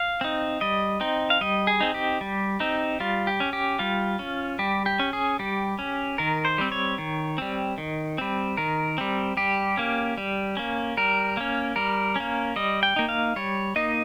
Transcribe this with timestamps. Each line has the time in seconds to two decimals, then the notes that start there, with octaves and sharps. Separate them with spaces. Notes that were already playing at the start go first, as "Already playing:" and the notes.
Already playing: F5
0.21 C4 D#4
0.61 G3 D#5
1.01 C4 D#4
1.30 F5
1.41 G3 D#5
1.67 G#4
1.80 C4 D#4
1.94 G4
2.21 G3
2.60 C4 D#4
3.00 G3 F4
3.27 G4
3.40 C#4
3.53 G4
3.79 G3 F4
4.19 C#4
4.59 G3 G4
4.86 G4
5.00 C#4
5.13 G#4
5.39 G3 G4
5.79 C#4
6.18 D#3 A#4
6.45 C5
6.58 G3 C4
6.72 C#5
6.98 D#3
7.38 G3 C4
7.78 D#3
8.18 G3 C4
8.57 D#3 A#4
8.98 G3 C4
9.37 G3 G4
9.77 A#3 C#4
10.18 G3
10.57 A#3 C#4
10.97 G3 A#4
11.37 A#3 C#4
11.76 G3 A#4
12.16 A#3 C#4
12.56 G3 D#5
12.83 G5
12.96 A#3 D#4
13.09 F5
13.36 G3 C#5
13.76 A#3 D#4 D#5